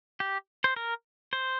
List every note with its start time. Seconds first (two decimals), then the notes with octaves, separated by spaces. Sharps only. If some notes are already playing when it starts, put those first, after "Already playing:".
0.20 G4
0.64 C5
0.76 A#4
1.33 C5